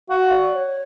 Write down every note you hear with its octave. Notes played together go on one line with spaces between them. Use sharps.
F#4 F5
D5
C#5